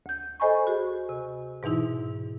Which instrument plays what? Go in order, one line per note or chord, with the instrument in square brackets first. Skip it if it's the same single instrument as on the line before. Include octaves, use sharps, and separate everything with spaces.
[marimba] D2 G6
A4 C5 D#5 G#5 B5 C#6
F#4 G#4
C3
G#2 B2 E3 D#4 E4